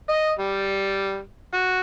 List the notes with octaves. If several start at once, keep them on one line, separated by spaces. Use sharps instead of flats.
D#5
G3
F#4